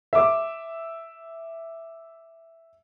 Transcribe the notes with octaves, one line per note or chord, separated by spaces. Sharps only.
E5 D6